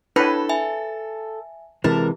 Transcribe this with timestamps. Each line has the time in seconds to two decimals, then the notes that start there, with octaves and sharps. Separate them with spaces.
0.16 D4 E4 A4 B4 C#5 B5
0.49 E5 G#5
1.84 C3 E3 G#3 A#4 A5